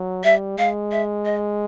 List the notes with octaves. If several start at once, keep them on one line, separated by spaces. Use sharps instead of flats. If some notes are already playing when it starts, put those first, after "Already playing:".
Already playing: F#3
G3 E5
G#3 F5
E5
D#5